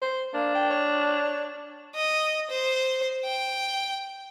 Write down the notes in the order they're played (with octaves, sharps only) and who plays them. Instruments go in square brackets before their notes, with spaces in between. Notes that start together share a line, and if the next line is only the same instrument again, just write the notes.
[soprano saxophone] C5
[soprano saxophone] A#3 [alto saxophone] D4
[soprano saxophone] G5
C#5
[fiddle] D#5
C5
G5